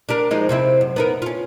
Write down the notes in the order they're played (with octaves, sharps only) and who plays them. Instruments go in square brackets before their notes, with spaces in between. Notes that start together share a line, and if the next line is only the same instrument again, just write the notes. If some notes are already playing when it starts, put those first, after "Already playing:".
[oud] D4 G4 A#4
F3 G#3 D#4
C3 C4 E4
F#2
B3 D#4 A#4
C#4 F4